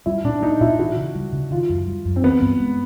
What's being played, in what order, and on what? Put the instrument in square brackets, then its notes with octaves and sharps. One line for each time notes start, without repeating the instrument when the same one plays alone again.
[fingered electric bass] G3 [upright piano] E4
[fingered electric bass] A#2 [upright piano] D4
[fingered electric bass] A#3 [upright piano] D#4
[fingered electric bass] A#2 [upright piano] E4
[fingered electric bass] E3 [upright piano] F#4
[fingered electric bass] C#3
G3
C#3
[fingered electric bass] D#3 [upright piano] F4
[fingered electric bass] F#2
G3
F#2
[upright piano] C4
[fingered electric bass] E3 [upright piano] B3
[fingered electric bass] G2
G#3